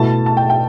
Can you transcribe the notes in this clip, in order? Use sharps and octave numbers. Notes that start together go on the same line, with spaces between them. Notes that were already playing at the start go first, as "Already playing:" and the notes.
Already playing: B2 A3 E4 A5
A5
G5
G5